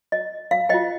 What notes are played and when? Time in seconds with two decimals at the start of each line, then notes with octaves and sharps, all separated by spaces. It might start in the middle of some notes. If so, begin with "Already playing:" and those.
0.12 D#5
0.51 F5
0.69 F4 C5 D#5 G5